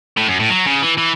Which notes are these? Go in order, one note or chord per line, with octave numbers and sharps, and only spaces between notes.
A2
F#2
A2
F#3
C#3
E3
E3